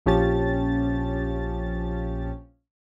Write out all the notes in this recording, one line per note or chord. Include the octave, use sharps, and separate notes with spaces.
A#1 F3 C#4 G4 A5 A6